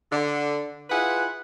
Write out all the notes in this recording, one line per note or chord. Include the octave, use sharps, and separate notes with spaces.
D3
E4 F4 G#4 B4 F#5